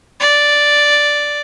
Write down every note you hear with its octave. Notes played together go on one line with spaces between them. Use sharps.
D5